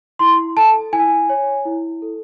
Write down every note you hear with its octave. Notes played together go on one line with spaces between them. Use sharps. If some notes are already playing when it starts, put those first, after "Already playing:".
E4 C6
A4 A5
E4 G#5
C#5
E4
A4